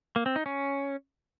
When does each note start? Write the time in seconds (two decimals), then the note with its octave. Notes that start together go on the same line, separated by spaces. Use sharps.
0.16 A#3
0.26 C4
0.36 D#4
0.46 C#4